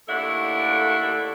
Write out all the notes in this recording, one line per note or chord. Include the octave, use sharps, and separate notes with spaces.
D#2 A3 D4 E4 A4 F#5